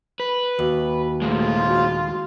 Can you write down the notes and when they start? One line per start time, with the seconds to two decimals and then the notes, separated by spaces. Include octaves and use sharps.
0.20 B4
0.59 D#2 F#4
1.22 A#2 G#3 A3 F4
1.66 F#4